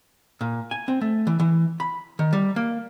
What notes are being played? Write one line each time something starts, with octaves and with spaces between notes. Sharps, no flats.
A#2
G#5
C4
A3
E3
E3
B5
D#3
G3
A#3